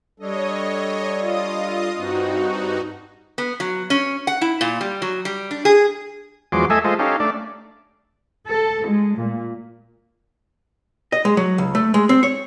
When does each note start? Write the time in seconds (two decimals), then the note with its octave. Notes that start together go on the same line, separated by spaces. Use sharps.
0.20 G3 D4 A4 C#5 D#5
1.20 F4 D#5 D#6
1.97 G2 C4 D#4 F#4
3.38 B3
3.60 F#3
3.90 C#4
4.27 F#5
4.41 E4
4.61 A#2
4.81 G3
5.02 F#3
5.25 G3
5.51 D4
5.65 G#4
6.52 E2 F3 F#3 G#3 C6 D6
6.70 A3 A4 D#5 E5 G#5
6.85 G#3 F4 A4 C5 D#5
6.99 C#4 D#4 G4 A4 F5
7.20 A3 D4 D5
8.48 A4
8.85 G#3
9.17 A#2
11.12 D#5
11.25 G#3
11.37 F#3
11.58 C#2
11.75 A3
11.94 G#3
12.09 C4
12.23 C#5